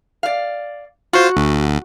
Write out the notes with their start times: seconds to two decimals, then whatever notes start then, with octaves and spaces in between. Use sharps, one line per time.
0.23 D5 F5
1.13 F4 F#4 C5
1.37 D2